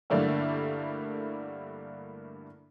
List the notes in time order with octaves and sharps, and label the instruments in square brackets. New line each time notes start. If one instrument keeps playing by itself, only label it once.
[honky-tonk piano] G2 D3 G3 A3 A#3 E4